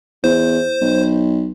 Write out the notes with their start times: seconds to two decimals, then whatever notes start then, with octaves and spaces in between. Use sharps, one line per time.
0.24 E2 C5
0.81 B1